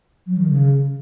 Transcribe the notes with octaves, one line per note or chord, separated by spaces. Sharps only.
F#3
D#3
C#3